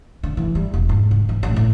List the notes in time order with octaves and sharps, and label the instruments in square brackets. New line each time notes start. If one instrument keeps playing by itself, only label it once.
[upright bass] D3
E3
G3
E1
G#2
D3
E3
A1
A2